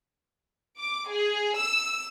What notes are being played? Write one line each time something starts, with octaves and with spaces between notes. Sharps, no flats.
D6
G#4
E6